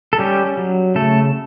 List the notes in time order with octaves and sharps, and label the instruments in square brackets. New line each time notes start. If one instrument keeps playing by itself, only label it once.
[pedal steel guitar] A4
G3 C#4 G4
F#3
C#3 A3 A4